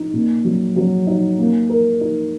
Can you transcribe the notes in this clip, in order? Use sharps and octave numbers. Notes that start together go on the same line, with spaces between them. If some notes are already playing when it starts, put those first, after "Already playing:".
Already playing: D#4
A#2
F#3
F#3
D#4
A#3
A#4
D#4